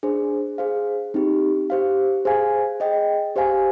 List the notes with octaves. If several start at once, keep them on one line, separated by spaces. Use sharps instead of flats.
D4 G#4 C5
G#4 C5 F5
C4 D#4 G4
G4 C5 F5
G#4 C5 F5 G#5
G#4 D#5 G5
G4 C5 F5 G#5